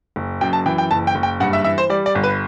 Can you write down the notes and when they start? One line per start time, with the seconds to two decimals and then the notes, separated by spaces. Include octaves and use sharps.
0.16 F#1
0.41 F#2 G5
0.53 A5
0.66 E3 G5
0.78 G5
0.91 F#1 A5
1.07 G5
1.15 F#1
1.23 G5
1.40 G2 F#5
1.53 E5
1.64 E3 E5
1.78 C5
1.90 G3 D5
2.06 D5
2.15 G1
2.23 B4